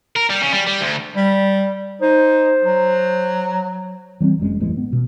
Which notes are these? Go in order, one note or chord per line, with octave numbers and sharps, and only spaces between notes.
A#4
G3
C#3
G3
G3
D2
G3
D#4 C5
F#3
E3 G3 A3 C4
F#1 F#2 G#3
A1 E2 E3 G#3
B3
B2